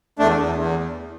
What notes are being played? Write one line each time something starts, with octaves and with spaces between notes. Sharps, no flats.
E2 A3 D4
E2
E2